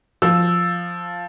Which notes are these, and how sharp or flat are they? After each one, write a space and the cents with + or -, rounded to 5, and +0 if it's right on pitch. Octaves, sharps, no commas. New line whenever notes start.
F3 +0 E6 +0